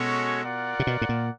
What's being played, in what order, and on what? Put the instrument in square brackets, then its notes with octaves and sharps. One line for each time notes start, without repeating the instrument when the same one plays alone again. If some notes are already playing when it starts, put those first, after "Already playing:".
Already playing: [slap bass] B2 [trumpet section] G#3 C#4 F#4 A4 C#5
[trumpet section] F4 A#4 D5 F#5
[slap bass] C3
B2
A2
A#2